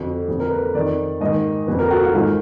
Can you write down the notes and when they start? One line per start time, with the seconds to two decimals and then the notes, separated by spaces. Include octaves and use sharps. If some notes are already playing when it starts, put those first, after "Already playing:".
Already playing: F2 D3 F#4
0.28 F2 D3
0.40 A#4
0.51 B4
0.75 F2 D#3 D5
1.21 G#2 D#3 D#5
1.67 F2 D3 B4
1.79 A#4
1.91 F#4
2.03 F4
2.14 G#2 D#3 F4